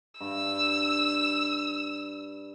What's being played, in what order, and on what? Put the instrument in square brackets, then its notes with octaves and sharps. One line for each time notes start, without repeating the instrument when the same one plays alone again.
[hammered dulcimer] G2 [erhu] E6